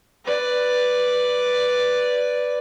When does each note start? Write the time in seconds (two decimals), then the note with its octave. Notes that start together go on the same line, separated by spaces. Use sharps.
0.25 B4 D5